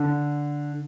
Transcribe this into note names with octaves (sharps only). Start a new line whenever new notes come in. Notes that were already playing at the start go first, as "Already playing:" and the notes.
Already playing: D3